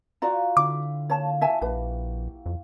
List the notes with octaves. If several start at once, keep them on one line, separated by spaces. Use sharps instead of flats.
F4 F#4 D5 G5 A#5
D3 E4 D6
A#3 C#5 A5
F#4 E5 G#5 A5
A#1 G4 B4
F2